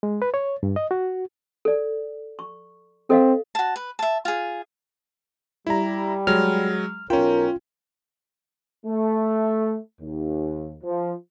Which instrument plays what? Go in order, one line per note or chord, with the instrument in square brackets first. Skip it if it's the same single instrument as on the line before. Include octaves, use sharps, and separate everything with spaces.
[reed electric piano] G#3
B4
C#5
G2
D#5
F#4
[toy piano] A4 D5
C#6
[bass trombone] C4 [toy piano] A4 D#5 F5
[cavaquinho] F#4 A5
B4
E5 A5
F4 G#4
[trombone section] G3 [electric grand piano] E4 A#5
[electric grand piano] F#3 G#3 [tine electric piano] F6
[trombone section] B1 A#4 [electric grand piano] C#4 G5 [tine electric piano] F4
[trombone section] A3
D#2
F3